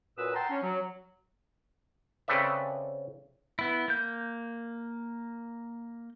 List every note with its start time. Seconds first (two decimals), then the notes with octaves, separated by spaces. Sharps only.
0.17 F#2 A#2 B4 D#6 E6
0.34 F#5 G5 A5 A#5 C6
0.50 C#4
0.62 F#3
2.28 C#3 C4 A4 B4 D5 E5
3.59 B3 E4
3.88 A#3 G6